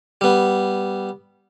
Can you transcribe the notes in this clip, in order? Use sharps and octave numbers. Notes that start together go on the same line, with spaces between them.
G3 B3